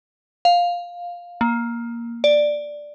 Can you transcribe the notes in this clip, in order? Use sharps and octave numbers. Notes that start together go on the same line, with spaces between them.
F5
A#3
D5